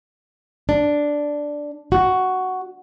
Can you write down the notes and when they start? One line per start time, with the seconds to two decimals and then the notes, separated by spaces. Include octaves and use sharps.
0.69 D4
1.92 F#4